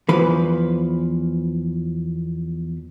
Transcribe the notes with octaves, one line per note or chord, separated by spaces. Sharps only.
E2 E3 F3 B4 B5